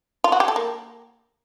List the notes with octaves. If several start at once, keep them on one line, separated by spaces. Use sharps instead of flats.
F4
F#4
G4
A4
A#3